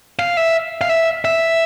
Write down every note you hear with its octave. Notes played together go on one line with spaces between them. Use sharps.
F5
E5
F5
E5
E5